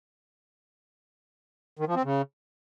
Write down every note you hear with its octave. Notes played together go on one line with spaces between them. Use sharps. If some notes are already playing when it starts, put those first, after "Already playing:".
D#3
F3
C4
C#3